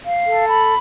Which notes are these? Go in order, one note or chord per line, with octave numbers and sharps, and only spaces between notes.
F5
A4
B5